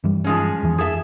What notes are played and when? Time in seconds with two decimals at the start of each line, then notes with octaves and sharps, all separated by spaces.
0.04 G2 E3 G3
0.24 F3 G#3 C#4
0.63 E2 E3
0.78 F2 G#4 A4 E5